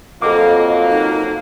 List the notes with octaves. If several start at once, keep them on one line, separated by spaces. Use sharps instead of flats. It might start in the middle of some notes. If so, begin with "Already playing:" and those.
F2 F#3 A#3 A4 D#5 D6
D#4